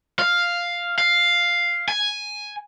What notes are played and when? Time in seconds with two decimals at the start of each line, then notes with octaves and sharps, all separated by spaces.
0.19 F5
0.98 F5
1.88 G#5